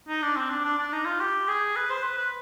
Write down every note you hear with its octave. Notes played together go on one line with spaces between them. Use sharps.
D#4
D4
C4
D4
D4
D4
D#4
F4
G4
G#4
B4
C5
B4
B4